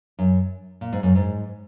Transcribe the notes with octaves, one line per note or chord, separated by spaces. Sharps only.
F#2
A#2
G#2
F#2
G#2